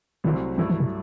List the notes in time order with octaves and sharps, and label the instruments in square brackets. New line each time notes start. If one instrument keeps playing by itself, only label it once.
[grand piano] C2 C3 F#3 A3 C4 [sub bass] D#3
[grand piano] G2 F#3 A3 E4 [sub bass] E3
[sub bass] E3
C3